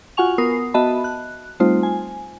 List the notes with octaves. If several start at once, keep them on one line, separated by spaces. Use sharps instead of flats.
F4 F#4 F#5 G#5 C#6 F7
B3 A#4 D#6 C7
B3 F#4 D#5 E5 A5 B5
F#6
G3 A3 C4 D#4 F4 C5
G#5